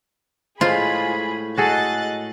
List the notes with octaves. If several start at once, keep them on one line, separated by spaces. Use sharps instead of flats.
A2 G#3 F4 G#4 C5 B5
F#4 G#4 A4 D#5 F#6 A6